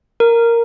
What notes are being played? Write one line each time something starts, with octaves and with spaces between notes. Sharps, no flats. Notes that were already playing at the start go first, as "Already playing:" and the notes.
A#4